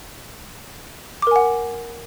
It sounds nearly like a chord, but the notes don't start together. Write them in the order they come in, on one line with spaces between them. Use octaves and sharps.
D6 A#4 G#5 F#5